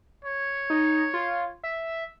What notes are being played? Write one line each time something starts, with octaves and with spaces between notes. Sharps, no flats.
C#5
D#4
F4
E5